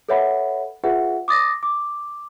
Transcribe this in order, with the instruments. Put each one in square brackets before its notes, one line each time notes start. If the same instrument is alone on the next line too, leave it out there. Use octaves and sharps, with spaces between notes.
[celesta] A4 B4 C#5 E5 F#5 B5
F4 G#4 B4 E5 F#5
D6 D#6 A6 A#6
D6